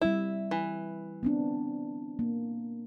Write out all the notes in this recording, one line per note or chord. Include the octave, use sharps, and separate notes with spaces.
G3 C4 E4 E5
E3
B3 C4 D4
A#3